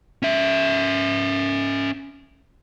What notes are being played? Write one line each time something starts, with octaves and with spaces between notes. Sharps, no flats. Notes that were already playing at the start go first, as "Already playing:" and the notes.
C#4 E5